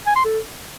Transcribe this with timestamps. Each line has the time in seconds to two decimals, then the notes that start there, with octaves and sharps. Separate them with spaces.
0.07 G#5
0.16 C6
0.25 A4